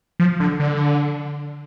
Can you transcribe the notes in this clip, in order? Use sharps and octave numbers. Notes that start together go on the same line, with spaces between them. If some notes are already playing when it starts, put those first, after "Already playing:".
F3
D3
D3